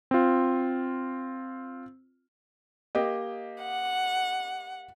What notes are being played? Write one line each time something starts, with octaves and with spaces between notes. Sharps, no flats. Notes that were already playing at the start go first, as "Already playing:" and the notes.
C4 F4
A#3 G4 D#5
F#5